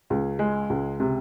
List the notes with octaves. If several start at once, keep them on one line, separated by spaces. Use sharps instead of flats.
C#2
G#3
C#2
C3